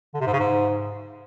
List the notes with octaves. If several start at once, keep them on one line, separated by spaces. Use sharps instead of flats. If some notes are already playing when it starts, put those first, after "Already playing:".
D3
C3
G#2
C#3
G#2